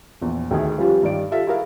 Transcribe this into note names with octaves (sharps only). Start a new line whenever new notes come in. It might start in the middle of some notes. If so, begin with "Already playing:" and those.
A#1 E2
D2 D#3 G#4 E5
F3 G3 C#4 F4 G4 B4
G2 D#3 D5 D7
F4 G4 A4 E5 F5
E4 F#4 G#4 A#4 E5 F5